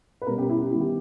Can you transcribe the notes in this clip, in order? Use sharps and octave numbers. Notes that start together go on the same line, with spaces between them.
B4
B2 G3 C#4 A#4
G4
E4
G4
D#3 G3 B3 E4
G4